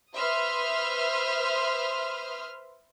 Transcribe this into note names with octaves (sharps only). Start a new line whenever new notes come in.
B4 C5 E5 C6 D#6 F6